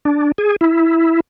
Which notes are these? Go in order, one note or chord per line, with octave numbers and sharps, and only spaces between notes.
D4
G#4
E4